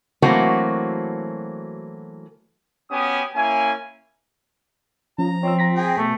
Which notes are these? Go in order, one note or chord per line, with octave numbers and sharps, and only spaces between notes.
E3 F#3 A3 A#3 C4 F#4
B3 C#4 F#4 G4 G#5 D#6
A#3 C#4 E4 G#5
F3 C#4 A#5
C4 C#5 D#5 E6
A#5 A#6 B6
G#4 G5
B2 A3